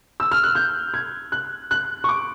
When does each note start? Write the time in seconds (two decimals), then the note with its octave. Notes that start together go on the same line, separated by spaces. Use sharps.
0.20 E6
0.31 F6
0.44 F#6
0.55 G6
0.94 G#6
1.32 F#6
1.71 F#6
2.04 C#6
2.09 D6